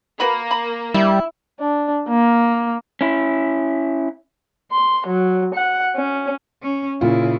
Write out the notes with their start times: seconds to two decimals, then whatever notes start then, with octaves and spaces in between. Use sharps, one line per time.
0.20 A#3 F#4 B4 B5
0.51 A#5 B5
0.94 G3 E4
1.60 D4
2.09 A#3
3.01 C#4 E4
4.72 C6
5.07 F#3
5.55 F#5
5.96 C#4
6.63 C#4
7.01 A#2 C#3 E4 F4